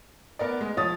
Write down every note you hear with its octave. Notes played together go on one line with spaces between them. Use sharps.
B3 A#4 D5
G#3
F3 C#5 D#6 A6